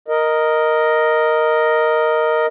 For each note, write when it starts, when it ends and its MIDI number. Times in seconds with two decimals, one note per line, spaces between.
0.08 2.46 70
0.08 2.46 75